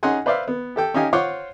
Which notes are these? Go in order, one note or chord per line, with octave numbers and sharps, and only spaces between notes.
C#4 D#4 G#4 F#5 G#5 C6
B4 C5 D5 E5 F5
B3
G4 A4 G5
C#4 D#4 G4 F5 G#5
F4 C5 C#5 F#5 C6 D6